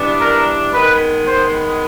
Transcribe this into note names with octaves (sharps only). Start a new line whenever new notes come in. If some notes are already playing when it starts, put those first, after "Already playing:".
Already playing: E3 G3 B3 D4
A#4
D#3 G#3 B3 B4
C5